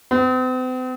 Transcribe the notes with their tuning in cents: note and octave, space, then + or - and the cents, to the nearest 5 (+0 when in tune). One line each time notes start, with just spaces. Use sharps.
C4 -45